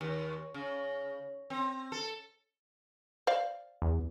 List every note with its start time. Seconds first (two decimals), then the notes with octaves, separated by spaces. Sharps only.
0.01 D#2
0.54 C#3
1.50 C4
1.92 A4
3.27 C5 D5 F5
3.82 E2